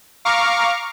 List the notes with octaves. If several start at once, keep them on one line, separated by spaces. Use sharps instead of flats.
F5 A#5 C#6 D6 F6